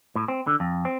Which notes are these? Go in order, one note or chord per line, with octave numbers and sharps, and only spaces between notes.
A2
C4
D3
F2
C4